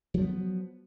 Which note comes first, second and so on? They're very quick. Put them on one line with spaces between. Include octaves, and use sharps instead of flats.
F#3 F3 B3